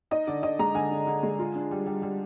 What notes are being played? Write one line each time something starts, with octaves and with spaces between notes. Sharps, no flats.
D#4 D#5
D3 D5
D3 D#5
G#3 A#5
D3 G#5
D3
D3
G#3
F4
D4
G3
G3
G3